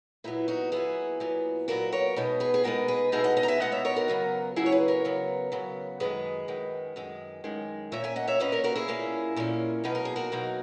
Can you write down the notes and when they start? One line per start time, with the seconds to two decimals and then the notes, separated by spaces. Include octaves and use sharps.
0.24 A#2 F#3 B3 E4
0.48 D#4 F#4
0.72 A#2 F#3 B3 E4 G#4
1.20 A#2 F#3 B3
1.68 A#2 F#3 B3 F#4 A#4
1.92 A#4 C#5
2.16 B2 G#3 B3 D#4
2.40 G#4 B4
2.54 G#4
2.64 B2 G#3 B3 D#4 F#4 A#4
2.88 G#4 B4
3.12 B2 G#3 B3 D#4 E4 G#4
3.24 D#5 F#5
3.37 D#5 F#5
3.43 A#5
3.48 E5 G#5
3.60 B2 G#3 B3 D#4 D#5 F#5
3.72 C#5 E5
3.85 A#4 C#5
3.96 F#4 A#4
4.08 C#3 F#3 B3
4.56 C#3 F#3 B3 E4 G#4
4.66 C#5
4.72 G#4 B4
4.88 A#4 C#5
5.05 C#3 F#3 B3
5.52 C#3 F#3 B3
6.00 F#2 D#3 G#3 G#4 B4
6.48 F#2 D#3 G#3
6.96 F#2 D#3 G#3
7.44 F#2 D#3 G#3
7.92 A#2 A#3 C#4 C#5 E5
8.04 E5 G#5
8.16 D#5 F#5
8.28 C#5 E5
8.40 A#2 A#3 C#4 B4 D#5
8.52 A#4 C#5
8.64 F#4 A#4
8.76 E4 G#4
8.88 A#2 A#3 C#4
9.36 A#2 A#3 C#4
9.84 B2 F#3 A#3 D#4 B4
9.95 A#4
10.05 G#4
10.16 F#4 A#4
10.32 B2 F#3 A#3 D#4